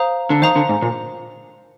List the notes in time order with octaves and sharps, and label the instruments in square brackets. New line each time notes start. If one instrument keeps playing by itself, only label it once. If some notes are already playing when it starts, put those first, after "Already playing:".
Already playing: [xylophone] C5 F5 A#5 D#6
[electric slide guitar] D3
[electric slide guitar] D#3 [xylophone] C5 F5 A#5 D#6
[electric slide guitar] D3
G#2
A#2